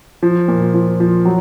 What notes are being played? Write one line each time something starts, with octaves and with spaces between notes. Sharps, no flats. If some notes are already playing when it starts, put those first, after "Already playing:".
F3
A#2
F3
F3
F#3